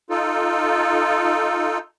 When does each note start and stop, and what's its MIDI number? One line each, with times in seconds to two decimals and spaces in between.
0.10 1.78 63
0.10 1.78 65
0.10 1.78 69